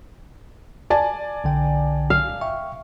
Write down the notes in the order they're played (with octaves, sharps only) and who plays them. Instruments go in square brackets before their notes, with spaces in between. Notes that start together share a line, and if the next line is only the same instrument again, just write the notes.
[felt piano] D5 G#5 A5
[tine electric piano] B1 D3 G5
[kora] F5
[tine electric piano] E5 G5 C#6